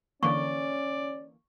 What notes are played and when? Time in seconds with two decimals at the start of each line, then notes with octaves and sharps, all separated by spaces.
0.23 D3 E3 A#3 C#4 D5 C#6